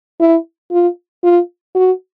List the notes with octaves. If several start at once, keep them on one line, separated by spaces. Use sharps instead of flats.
E4
F4
F4
F#4